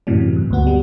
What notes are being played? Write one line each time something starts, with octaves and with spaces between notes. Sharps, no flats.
F#2 A2 C3 E3 F#3
G2
D2 G2 B3 F#4
G3